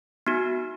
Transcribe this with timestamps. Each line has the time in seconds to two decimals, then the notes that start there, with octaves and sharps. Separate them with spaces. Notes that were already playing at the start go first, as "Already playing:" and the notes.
0.27 B3 D#4 F#4